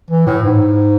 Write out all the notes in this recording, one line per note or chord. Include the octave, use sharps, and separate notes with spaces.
E3
A2
G#2